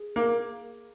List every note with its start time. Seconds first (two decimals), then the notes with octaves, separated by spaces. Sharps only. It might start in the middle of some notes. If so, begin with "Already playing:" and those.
Already playing: G#4
0.16 A#3